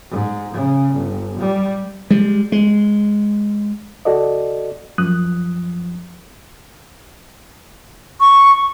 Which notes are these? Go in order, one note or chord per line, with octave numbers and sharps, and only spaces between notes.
G#2
C#3
G1
G3
G3 G#3
G#3
C#2 F#4 A4 D5 D#5
F#2 F3 D#6 F#6
C#6